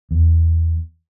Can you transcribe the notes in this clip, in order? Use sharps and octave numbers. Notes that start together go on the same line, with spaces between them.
E2